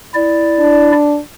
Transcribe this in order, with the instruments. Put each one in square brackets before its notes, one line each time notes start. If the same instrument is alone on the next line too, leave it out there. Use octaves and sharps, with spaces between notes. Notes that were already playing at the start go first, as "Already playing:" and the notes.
[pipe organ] E4 D5
[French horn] D4